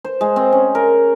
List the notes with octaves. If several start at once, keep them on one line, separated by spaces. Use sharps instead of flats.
C5
G#3
C4
C#4
A#4